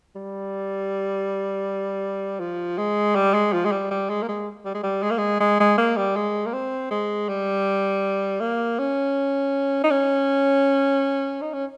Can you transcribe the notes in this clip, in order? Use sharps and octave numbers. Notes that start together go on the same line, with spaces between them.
G3
F3
G#3
G3
G#3
F3
G#3
G3
G3
G#3
A#3
G#3
G3
G#3
G3
G#3
A#3
G#3
G#3
G#3
A#3
G3
G#3
A#3
C4
G#3
G3
A#3
C#4
D#4
C#4
D#4
C#4